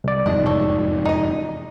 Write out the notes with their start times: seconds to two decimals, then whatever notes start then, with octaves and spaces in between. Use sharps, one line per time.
0.04 C2 D5
0.26 F1 E2 G#2 D4 D#5
0.46 A4 C#5
1.05 D#4 D#5